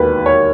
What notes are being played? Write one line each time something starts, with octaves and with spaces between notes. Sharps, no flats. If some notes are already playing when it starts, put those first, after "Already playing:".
Already playing: E1 D#2 D#3 B4
C#5